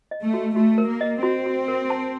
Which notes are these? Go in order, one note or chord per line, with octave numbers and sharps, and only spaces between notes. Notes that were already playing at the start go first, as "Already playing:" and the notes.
D#5
A3
F#4
A3 F#4
A#4
A#3
D#5
C4 F#4
F#4
A#4
A5